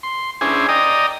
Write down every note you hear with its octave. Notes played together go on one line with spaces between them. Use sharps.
C6
C#4 D4 E4 G#4 C5 G#5
D5 D#5 G5 A#5 D#6